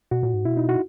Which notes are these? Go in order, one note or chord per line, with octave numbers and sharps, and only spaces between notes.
B2 F#4
A#2
G#2
B2 E4
D#4
F#4